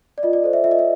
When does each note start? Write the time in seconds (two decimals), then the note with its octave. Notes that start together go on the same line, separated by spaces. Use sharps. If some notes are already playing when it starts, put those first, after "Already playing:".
0.18 D5
0.23 F4 D#5
0.33 D5
0.44 A4 C5
0.53 E5
0.64 F4 E5
0.71 D#5
0.79 E5